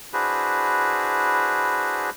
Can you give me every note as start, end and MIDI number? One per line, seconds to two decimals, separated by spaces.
0.13 2.10 62
0.13 2.10 64
0.13 2.10 66
0.13 2.10 68
0.13 2.10 71
0.13 2.10 72